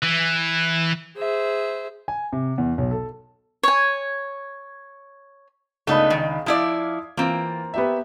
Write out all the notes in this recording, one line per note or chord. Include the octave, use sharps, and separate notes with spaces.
E3
G#4 C5 E5
G#5
C3
E2
B1
A4
C#5 G#5
C#2 A3 B3 D4 D#4 B5
D#3
F3 E4 D5 F5 D#6 G#6
E3 A#3 C4 F4
B3 G4 E5